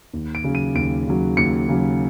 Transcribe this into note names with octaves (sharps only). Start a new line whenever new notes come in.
D#2
D7
C#3 F#3
D#7
D#2 D7
C#3 F#3
D#2 C#7
C#3 F#3